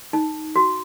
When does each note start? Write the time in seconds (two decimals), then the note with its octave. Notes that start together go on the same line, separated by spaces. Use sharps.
0.13 D#4
0.56 F#4